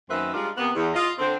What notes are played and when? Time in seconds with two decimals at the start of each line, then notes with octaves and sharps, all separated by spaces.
0.09 F#2 D#3 A#3 C4 B4 E5
0.34 G3 G#3 D4 D#4 F4
0.58 C3 A#3 B3
0.75 E2
0.94 F4 D#5
1.19 D3 C4